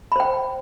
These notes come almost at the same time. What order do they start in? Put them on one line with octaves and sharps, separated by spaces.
B5 C5 G5